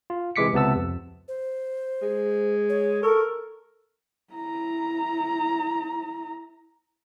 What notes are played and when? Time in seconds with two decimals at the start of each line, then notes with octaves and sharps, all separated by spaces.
0.10 F4
0.36 C3 E3 G#3 D6 B6 C#7
0.53 C#2 C3 B3 A5 E6
0.75 F2
1.28 C5
2.02 G#3
2.70 C#5
3.03 A4 A#4 C#6
4.33 E4 A#5